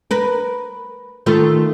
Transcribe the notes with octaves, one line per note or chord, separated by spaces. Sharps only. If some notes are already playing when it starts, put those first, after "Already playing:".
A#4 B4
D#3 A3 F4